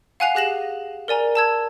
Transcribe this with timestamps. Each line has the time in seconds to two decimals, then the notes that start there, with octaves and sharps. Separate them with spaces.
0.20 F5 F#5 G#5 F#6 C7 F7
0.35 G4 G#4 F#6 A#6 E7 F#7
1.08 A#4 D5 G#5 A#5
1.35 A5 E6 G#6